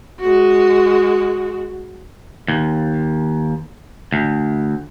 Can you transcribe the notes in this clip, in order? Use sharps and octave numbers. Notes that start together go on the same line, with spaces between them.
G#3 F#4
D#2
D2